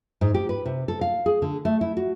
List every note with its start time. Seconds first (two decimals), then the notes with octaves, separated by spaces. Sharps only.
0.21 G#2
0.34 G4
0.49 B4
0.66 C3
0.88 A4
1.01 F5
1.26 G#4
1.42 D3
1.65 A3
1.81 E4
1.97 F#4